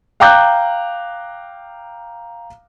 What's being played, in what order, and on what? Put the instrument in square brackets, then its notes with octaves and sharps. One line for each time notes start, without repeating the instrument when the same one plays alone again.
[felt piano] F5 G5 A#5 D6 F#6 G6